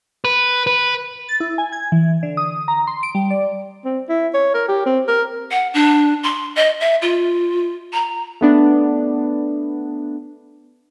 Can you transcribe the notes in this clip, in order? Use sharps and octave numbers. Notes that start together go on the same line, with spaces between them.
B4
B4
A6
E4
G#5
G#6
E3
D3
D#6
A#5
C6
D7
G3
D5
C4
E4
C#5
A#4
G4
C4
A#4
F#5
D4
C6
D#5
E5
F4
A#5
A3 B3 D4